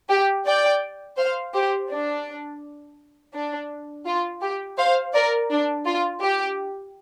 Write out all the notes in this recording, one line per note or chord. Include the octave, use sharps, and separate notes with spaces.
G4
D5 G5
C5 F5
G4 C5
D4
D4
F4
G4
C5 F5
A#4 D5
D4
F4
G4